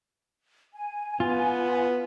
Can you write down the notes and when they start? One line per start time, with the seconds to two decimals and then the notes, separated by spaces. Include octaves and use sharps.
0.74 G#5
1.20 B3 F4